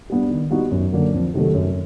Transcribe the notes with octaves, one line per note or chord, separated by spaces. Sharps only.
G3 B3 D4 G4
D#3
G3 B3 D#4 F#4
F#2
D3 F#3 A#3 D4
F2
C3 D#3 F#3 A3
F#2